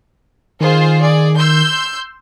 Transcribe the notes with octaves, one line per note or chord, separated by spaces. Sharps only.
D#3 F4 G#4 C5
G#4 D5
C6 E6 G6